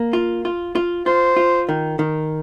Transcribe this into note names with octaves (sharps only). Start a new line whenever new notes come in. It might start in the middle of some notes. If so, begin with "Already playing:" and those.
Already playing: A#3
F4
F4
F4
F4 C5
F4
D#3
D#3